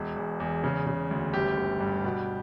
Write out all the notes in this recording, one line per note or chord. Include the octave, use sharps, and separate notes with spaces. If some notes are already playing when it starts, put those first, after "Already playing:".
Already playing: E1
E2
E2
C#3
C#3
D2
G1 G4
G1
G2
B2